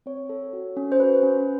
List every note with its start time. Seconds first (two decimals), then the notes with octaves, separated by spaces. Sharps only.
0.06 C4 C#5
0.29 A4
0.53 F#4
0.77 C#4
0.92 C5
1.00 F#4 B4
1.23 C#4